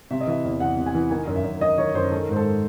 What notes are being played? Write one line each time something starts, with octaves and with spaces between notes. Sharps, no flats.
C3 E5
D#5
E3 E5
E2
E2 F#5
C3
G#5
E3
D#3 G#5
F#2
E5
F#2
D#3 D#5
D#3 C#5
F#2 C5
D#3 A4
G#2 C5
A4